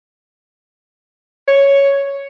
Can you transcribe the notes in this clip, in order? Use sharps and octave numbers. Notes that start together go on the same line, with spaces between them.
C#5